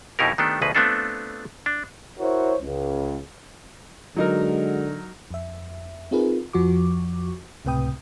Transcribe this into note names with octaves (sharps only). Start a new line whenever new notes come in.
F2 B2 D#4 E4 G4 A#4
D#3 A3 B3 D4 G4 A4
D2 B2 F3 D#4 G#4 B4
A3 B3 C4 D4 F4 A4
D4
E4 F#4 A#4 C5 C#5
C#2
D3 F#3 G#3 D#4 F#4 A#4
F2 E5
C4 D#4 F4 G#4 A#4 B4
F2 F3 F#4 C#6 D6
C#2 A2 C3 B4 G5 D#6